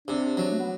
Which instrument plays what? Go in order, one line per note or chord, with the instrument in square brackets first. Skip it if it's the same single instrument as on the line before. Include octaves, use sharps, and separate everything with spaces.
[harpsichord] C3 [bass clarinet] D4
[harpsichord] F#3
[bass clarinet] A3
B3